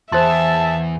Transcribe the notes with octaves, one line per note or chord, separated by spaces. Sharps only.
E2 C5 E5 A5 C6